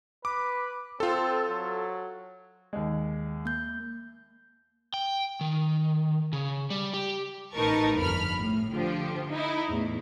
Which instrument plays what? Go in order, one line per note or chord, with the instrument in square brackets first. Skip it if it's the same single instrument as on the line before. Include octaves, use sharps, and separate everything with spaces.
[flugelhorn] B4 [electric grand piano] D6
[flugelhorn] C4 [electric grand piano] F4 A4
[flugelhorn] F#3
[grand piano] D#2 G#3
[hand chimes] A#3 G6
[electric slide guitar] G5
D#3
C#3
G3
G4
[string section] A1 D#4 A#4 B4 A5 C#6
G1 F2 B5 F6
A2
D3 F3 G4
D#4 E4
E2 A2